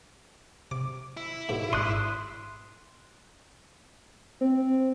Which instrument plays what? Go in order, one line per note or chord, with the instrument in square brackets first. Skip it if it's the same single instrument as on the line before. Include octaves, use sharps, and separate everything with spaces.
[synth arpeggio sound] C3 [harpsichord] D6
[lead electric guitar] E4
[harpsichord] D#2 G#2 B2
[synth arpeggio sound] G#1 G#2 [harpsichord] D4 [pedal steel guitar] C6 D#6 F#6
[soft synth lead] C4